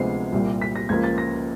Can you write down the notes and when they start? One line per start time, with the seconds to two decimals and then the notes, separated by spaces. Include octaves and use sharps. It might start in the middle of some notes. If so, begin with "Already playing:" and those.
Already playing: D2 C3 F3 G#3 B3 C7
0.32 C2 A#2 G3
0.62 B6
0.76 A#6
0.89 C#2 C#3 F3 A#3 G#6
1.04 A6
1.18 A#6